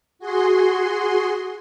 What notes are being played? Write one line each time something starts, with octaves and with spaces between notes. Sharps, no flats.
F#4 G#4 C6